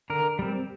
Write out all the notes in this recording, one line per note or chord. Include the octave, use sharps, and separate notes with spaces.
D3 A#4
G3 C4